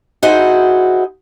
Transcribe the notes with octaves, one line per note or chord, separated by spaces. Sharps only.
D#4 E4 F#4 G#4 C5